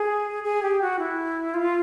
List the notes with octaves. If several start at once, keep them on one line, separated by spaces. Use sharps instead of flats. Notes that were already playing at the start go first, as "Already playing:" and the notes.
Already playing: G#4
G#4
G4
F#4
E4
F4